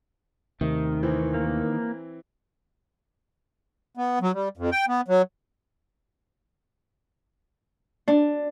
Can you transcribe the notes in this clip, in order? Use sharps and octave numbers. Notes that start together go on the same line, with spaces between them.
D#2 C3 D#3 A3
E3 C4 E4
A#3
B3
F#3
G3
F2
G5
B3
F#3
D4